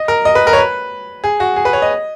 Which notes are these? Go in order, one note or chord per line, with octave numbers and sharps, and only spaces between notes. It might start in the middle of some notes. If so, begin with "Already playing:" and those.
Already playing: D#5
A#4
D#5
B4
A#4
C#5
B4
G#4
F#4
G#4
B4
C#5
D#5